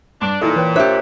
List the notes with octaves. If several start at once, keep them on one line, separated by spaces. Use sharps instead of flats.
G2 D4
A#2 E3 D#4 A4
E3 B4 C#5 G5
D4 G4 C5 C#5 E5 F#6